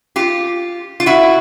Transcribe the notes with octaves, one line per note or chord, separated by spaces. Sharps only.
F4 G4
F4
E4 F#4